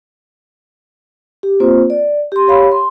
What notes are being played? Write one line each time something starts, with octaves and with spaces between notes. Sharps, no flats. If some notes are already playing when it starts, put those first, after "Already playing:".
G4
A#3 C4 F4 C5
D5
G4 C6
G4 C#5 F5 B5
C6